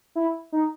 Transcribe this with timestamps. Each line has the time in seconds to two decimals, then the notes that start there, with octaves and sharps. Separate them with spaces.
0.15 E4
0.52 D#4